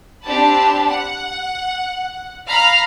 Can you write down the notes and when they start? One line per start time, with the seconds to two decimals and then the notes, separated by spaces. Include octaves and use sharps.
0.24 C4 D4 G4 A5 B5
0.88 F#5
2.47 F5 A#5 B5 F6